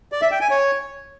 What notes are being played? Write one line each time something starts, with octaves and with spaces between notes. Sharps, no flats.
D5
E5
G5
G#5
C#5